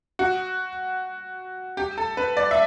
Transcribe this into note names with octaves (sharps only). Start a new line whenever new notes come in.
F#4
G4
A4
B4
D5
E5